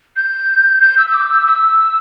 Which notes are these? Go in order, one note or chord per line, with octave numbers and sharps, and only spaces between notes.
G6
G6
E6
E6
D6
E6
E6